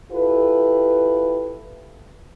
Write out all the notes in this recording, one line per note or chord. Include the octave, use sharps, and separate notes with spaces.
E4 F4 G4 A4 B4